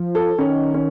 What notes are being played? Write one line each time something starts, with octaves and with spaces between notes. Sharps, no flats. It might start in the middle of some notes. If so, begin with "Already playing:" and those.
Already playing: F3
A4
D#3 C#4
C#4